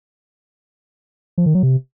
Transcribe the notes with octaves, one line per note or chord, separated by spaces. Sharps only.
F3
D#3
F#3
C3